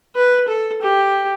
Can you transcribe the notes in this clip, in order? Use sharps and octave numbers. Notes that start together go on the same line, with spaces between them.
B4
A4
G4